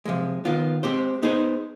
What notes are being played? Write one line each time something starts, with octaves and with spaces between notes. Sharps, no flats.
C3 F3 G#3
D#3 B3 F4
G#3 C4 G4 C5
B3 D#4 G#4 C5